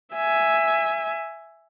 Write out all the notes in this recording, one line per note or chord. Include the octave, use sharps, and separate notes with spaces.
E5 G#5